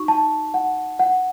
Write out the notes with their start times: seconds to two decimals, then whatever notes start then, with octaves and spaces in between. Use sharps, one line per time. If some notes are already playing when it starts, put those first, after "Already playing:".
Already playing: D#4 F#4 C#6
0.08 A5
0.54 F#5
0.99 F#5